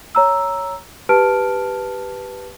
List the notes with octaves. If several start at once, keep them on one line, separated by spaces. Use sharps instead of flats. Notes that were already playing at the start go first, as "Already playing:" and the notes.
C#5 A#5 E6
G4 B4 A5 F6 D7